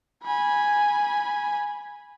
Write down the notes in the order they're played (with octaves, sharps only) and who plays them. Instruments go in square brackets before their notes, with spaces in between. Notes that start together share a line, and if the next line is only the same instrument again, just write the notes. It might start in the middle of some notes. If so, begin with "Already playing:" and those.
[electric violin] G#5 B5